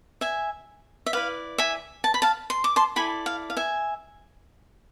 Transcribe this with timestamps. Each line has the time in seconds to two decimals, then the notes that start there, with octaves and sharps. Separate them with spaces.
0.21 E5 G#5
1.06 E5
1.13 E4 B4 D5 F5
1.58 E5 G#5
2.04 A5
2.14 B5
2.22 F5 A5
2.50 C6
2.64 D6
2.76 A5 C6
2.96 E4 A4 D5 G#5 B5
3.26 F5
3.50 F5
3.57 E5 G#5